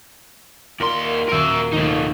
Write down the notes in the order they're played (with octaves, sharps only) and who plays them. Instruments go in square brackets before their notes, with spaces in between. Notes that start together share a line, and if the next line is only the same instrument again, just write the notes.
[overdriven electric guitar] D#2 C6 [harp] F4 A#4 D5
[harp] D#1 F#4 D#7 [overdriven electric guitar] A#4 E5
[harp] D#2 [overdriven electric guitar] A3 D#4